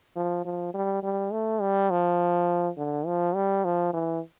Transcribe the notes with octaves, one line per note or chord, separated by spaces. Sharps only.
F3
F3
G3
G3
A3
G3
F3
D3
F3
G3
F3
E3